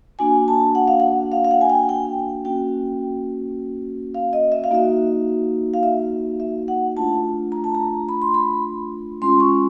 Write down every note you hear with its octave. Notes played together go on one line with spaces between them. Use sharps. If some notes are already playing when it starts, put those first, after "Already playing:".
A#3 D4 F#4 G#5
A5
F#5
F5
F#5
F5
F5
F#5
G#5
G5
G5
A#3 C#4 F#4 G5
F5
D#5
E5
F5
A#3 D#4 F#4 E5
F5
E5
E5
F#5
A3 D4 F4 A5
A#5
A5
A#5
B5
C6
B5
G#3 C#4 F4 C6
C#6